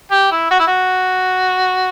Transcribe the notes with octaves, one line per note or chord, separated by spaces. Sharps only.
G4
E4
F#4
E4
F#4